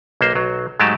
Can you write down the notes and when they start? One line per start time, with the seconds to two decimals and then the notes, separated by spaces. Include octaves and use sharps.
0.21 B1 A#3 C5
0.35 B1 F#3
0.79 G#2 F#3 G#3 A3 G4 A5